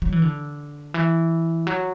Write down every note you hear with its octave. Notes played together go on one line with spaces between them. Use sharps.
F#3
E3
D3
E3
F#3